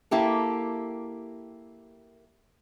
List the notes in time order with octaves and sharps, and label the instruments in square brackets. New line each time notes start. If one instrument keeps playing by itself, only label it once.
[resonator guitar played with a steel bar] A#3 E4 G4 A4